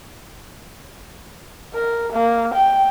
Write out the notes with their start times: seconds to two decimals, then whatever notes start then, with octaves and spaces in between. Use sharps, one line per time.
1.74 A#4
2.12 A#3
2.54 G5